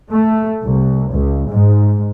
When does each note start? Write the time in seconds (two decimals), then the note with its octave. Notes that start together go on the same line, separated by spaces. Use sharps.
0.12 A3
0.64 C2
1.11 C#2
1.49 G#2